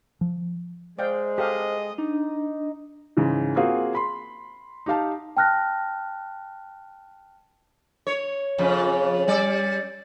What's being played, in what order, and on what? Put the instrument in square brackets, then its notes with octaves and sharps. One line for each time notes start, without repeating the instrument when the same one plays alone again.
[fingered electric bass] F3
[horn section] G#3 [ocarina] C5 [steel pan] D5 F5 G5
[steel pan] G4 A4 F5 [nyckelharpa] D#5
[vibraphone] D4 [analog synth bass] D#4
[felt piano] G#2 C#3 E3
A#3 C4 F4 F#4 G#4 C5
B5 C6
D#4 G4 F5 A5
[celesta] G5 A5 F6 F#6 A#6
[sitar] C#5
F2 C#3
G3 D5